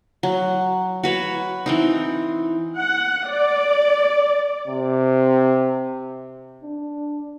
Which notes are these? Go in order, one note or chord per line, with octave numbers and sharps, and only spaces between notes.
F#3
F#4 B4 C#5
E3 C4 D#4
F#5
D5
C3
D4